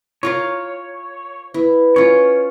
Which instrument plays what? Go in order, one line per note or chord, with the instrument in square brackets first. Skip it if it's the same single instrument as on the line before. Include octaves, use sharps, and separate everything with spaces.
[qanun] F4 A#4 F5 [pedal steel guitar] C#5
[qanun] E4 [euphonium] B4
[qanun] C#4 F4 [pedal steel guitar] C#5